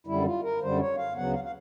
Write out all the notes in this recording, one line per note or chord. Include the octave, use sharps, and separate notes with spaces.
F#2 D3 G3 E4
F4
A#4
F#2 D3 G3 C5
C#5
F5
D2 C#3 F#3 B3 F#5
F5
F5